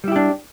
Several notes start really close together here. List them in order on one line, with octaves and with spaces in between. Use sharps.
G3 E4 G4 D4